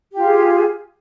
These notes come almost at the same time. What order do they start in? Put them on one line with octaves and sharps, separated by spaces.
G4 F4 G#4